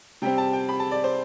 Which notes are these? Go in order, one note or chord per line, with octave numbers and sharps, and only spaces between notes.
C3 G3 C4 G5
A5
G5
B5
A5
D5
C5